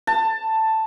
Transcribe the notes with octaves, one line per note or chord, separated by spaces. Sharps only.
A5